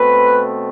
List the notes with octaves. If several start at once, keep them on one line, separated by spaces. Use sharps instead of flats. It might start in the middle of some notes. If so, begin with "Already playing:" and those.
Already playing: B2 A3 C4 B4